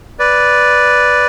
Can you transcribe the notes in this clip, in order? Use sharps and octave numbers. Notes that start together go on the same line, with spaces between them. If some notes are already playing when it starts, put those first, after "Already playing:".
B4 D5